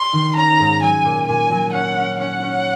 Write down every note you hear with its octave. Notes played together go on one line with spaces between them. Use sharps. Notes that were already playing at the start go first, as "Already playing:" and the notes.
Already playing: C6
D#3
C#4 A#5
G#2
F#3 G#5
A#2
A#2 G#5
F#3
C#4 F#5
C#4
C#4 F#5
C#4